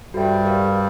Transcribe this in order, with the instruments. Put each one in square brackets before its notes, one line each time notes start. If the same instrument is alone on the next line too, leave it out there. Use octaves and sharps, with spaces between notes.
[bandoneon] G2 G3 [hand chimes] F#4 A4 C5 E5 G5
[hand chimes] G4 A#4 D5 F5